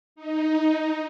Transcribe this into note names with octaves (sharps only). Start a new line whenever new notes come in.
D#4